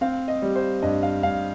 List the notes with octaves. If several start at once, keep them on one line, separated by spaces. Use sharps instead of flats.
C4 F5
D#5
G3
C5
G2 D#5
F5
G2 F5